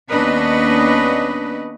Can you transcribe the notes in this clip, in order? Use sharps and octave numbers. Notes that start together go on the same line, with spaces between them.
D#2 B3 C#4 D4 B4 D#5